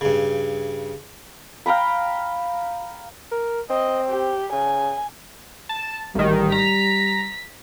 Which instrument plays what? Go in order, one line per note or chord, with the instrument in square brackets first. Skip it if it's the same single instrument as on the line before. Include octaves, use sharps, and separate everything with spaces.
[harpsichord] G2 C#3
[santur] F5 G5 A#5 B5
[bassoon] A#4
[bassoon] C4 [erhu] D#5
[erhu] G4
[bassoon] C#3 [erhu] G#5
[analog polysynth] A5
[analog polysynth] A1 D#3 [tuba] G3
[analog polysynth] A#5 [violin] B6